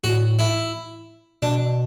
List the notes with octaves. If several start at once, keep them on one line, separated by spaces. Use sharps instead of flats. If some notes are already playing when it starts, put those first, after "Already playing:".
A2 F#4
E4
B2 D4